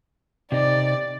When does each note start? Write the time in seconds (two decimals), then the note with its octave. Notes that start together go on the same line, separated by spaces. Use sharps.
0.52 C3 D#4 D5